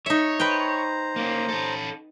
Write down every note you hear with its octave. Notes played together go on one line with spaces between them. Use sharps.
D#4 C#5 E5
B4 C5 G5 A#5
A#3 C#4
C#4 A4